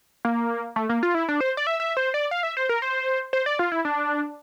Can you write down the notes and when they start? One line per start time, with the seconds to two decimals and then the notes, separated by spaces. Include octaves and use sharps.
0.25 A#3
0.76 A3
0.89 A#3
1.03 F4
1.15 E4
1.28 D4
1.41 C5
1.57 D5
1.67 E5
1.80 E5
1.97 C5
2.14 D5
2.31 F5
2.43 E5
2.57 C5
2.69 A#4
2.82 C5
3.33 C5
3.46 D5
3.59 F4
3.72 E4
3.85 D4